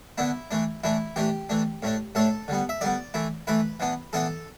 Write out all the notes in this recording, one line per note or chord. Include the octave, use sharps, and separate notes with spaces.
D3 B3 D4 E4
E3 A3 D4
E3 A3 D4 E4
E3 A3 D4 G4
E3 A3 D4
A2 A3 D4
A2 A3 D4 A4
D3 G3 B3
E5
D3 G3 B3 D5
E3 A3 E4
E3 A3 E4 B4
E3 B3 D4
E3 B3 D4 A4